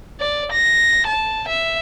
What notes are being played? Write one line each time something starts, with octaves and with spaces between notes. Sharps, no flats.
D5
A#6
A5
E5